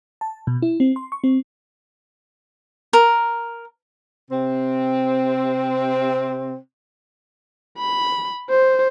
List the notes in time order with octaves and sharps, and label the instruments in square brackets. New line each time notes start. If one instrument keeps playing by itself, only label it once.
[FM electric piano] A5
B2
E4
C4
C6
C#6
C4
[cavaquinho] A#4
[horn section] C3 C4
[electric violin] B5
C5